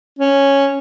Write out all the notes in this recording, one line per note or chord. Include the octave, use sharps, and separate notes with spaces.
C#4